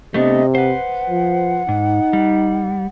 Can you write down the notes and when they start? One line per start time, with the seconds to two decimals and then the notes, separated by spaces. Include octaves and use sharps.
0.14 C3 A3 B3 D4 D#5
0.55 B4 C5 F#5
1.10 F3
1.68 G#2 D#4
2.13 G3